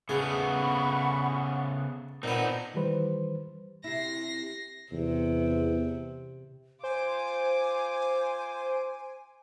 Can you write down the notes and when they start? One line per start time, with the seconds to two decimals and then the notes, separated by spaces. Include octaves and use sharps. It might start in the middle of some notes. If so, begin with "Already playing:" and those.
0.09 C#3 A3 B3 G#4 F#5 B5 C#6
2.23 A#2 B3 C4 D#4
2.74 D#3 E3 G3 B4 C5
3.84 C3 E4 A#6 C7
4.93 E2 C3
6.84 F4 C5 G#5 D6